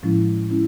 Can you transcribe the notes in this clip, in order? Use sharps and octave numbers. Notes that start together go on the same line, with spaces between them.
A2 F3 G#3 C#4 E4
G#3 C#4 E4